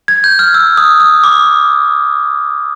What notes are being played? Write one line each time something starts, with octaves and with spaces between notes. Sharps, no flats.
G#6
G6
F6
E6
D#6
D#6
D6